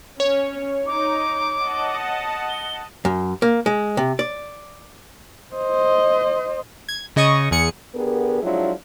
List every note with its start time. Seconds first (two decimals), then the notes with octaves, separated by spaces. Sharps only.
0.20 C#4 C#5
0.86 D#4 D6
1.62 D#5 F#5 A5
2.49 G7
3.05 F#2
3.42 A#3
3.66 G#3
3.97 C3
4.19 D5
5.55 C5 D#5
6.89 G#6
7.16 C#3 D#5 C#6 D#6
7.51 E2 G#4 C#7
7.95 D3 B3 G4 G#4 A#4
8.42 F3 F#3 G#3 D4 E4 F4